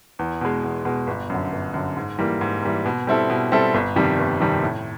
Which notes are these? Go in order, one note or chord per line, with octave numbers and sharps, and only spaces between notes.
E2
B2 G#3
E2
B2 G#3
G1
F#2 D3
G1
F#2 D3
G#2
E3 G3 A#3
G#2
E3 G3 A#3
B2
G3 C4 E4 A4
B2
G3 C4 E4 A4
G1
F2 C3 D#3 G3
G1
F2 C3 D#3 G3
A2